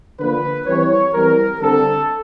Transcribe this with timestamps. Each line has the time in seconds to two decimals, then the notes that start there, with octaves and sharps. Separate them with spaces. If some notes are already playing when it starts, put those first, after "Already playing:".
0.19 D3 F3 A#3 B4
0.66 E3 G3 C4 C#5
1.14 E3 G3 C4 A#4
1.60 D3 G3 C4 A4